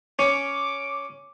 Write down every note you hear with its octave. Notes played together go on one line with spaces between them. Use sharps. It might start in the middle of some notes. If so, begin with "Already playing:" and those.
C#4 D6